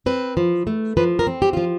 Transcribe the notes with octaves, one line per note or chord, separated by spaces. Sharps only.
C4 B4
F3
A3
F3 B4
A#4
C4
G4
F3 F4